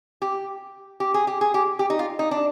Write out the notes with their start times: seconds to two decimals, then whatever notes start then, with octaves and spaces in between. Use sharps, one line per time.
0.22 G4
1.00 G4
1.14 G#4
1.27 G4
1.41 G#4
1.54 G4
1.79 G4
1.90 D#4
1.99 F4
2.19 D#4
2.31 D4